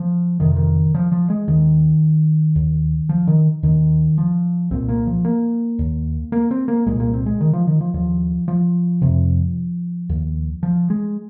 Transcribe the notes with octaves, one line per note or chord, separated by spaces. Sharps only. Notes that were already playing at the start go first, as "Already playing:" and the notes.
Already playing: F3
F2 C3 D#3
D#3
F3
F3
G#3
D#2 D#3
D#2
F3
D#3
D#2 D#3
F3
C2 A#2 C4
A#3
F3
A#3
D#2
A#3
C4
A#3
C2 A#2 G#3
A#3
C4
G#3
D#3
F3
D#3
F3
D#2 F3
F3
F2 C3
D#2
F3
G#3